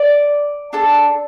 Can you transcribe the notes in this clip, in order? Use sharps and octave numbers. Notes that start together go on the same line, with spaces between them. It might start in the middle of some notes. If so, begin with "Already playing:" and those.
Already playing: D5
D4 A4